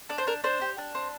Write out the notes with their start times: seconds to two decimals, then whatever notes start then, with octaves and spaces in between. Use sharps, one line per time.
0.09 D4 D5
0.18 C5
0.27 D4 A#4
0.44 D4 C5
0.61 G4
0.78 D4
0.95 C4